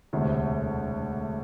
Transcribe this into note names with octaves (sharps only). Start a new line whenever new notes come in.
E1 D2 C3